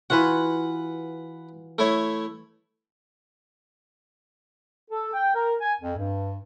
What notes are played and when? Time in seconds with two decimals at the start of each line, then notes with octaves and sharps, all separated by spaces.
0.10 E3 F4 F#4 B4 F#5
1.78 A3 E4 C#5
4.91 A4
5.14 G5
5.35 A#4
5.60 G#5
5.81 F2
5.97 G2